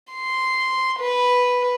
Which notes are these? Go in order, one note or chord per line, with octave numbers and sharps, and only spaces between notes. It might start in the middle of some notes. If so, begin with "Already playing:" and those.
C6
B4